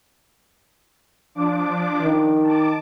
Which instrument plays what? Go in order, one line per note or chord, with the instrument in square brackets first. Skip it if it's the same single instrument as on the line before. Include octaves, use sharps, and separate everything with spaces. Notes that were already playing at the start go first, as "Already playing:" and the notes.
[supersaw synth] F3 D4 D6
[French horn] D#3
[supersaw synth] A5 D6